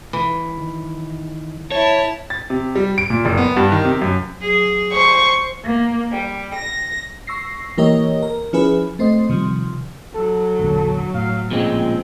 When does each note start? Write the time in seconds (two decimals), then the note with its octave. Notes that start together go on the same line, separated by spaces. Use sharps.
0.13 E3
0.58 D#3
1.72 E4 C#5 A5
2.30 A6
2.50 C3
2.75 G3
2.98 D7
3.10 A#2
3.25 F#1
3.37 B3
3.57 G2
3.72 D#3
3.85 C3
4.02 F#2
4.38 F#3 G#4
4.93 C5 C#6
5.63 A#3
6.11 G3
6.53 A#6
7.27 C#6 E6 A#6 C7
7.77 E3 A#3 G4 A#4 C#5 D#5
8.22 A#4
8.53 F3 C#4 E4 G#4 B4
8.99 A3 C4 C5 D#5
9.29 C3 D#3 F3 G3
10.14 F#3 A4
10.59 E1 A#1 D3
11.14 A2 F5
11.51 A#2 C#3 F3 G#3 C4